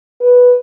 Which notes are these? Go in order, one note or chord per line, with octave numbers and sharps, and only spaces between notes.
B4